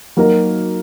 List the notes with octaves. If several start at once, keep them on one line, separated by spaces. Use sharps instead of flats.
F#3 A#3 D#4 F#4 A#4